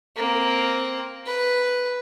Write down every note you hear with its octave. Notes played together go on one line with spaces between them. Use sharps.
A#3 C4
B4